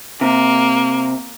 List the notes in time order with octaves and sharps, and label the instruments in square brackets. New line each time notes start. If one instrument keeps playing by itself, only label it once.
[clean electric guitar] C3 [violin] A#3